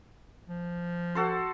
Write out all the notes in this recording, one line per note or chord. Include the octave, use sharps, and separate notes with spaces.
F3
F#4 A4 C5